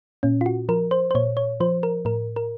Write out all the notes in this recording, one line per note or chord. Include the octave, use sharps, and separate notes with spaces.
A#2 C#4
F4
F#4
F3 A#4
C5
C5
A#2 C#5
C#5
F3 C5
A#4
A2 A#4
A#4